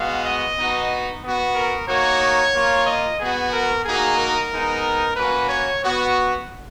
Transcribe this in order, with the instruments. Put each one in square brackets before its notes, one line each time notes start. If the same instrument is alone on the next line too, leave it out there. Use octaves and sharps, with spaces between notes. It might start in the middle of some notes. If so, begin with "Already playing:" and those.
Already playing: [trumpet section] G#3 B3 F#4 F5
D#5
B3 D#4 F#4
B3 F#4
A#4
A#3 D#4 F#4 C#5
A#3 F4
D#5
B3 F#4 G#4
A#4
A#3 D#4 F#4 G#4
A#4
G#3 B3 D#4
A#3 C#4 F#4 B4
C#5
B3 F#4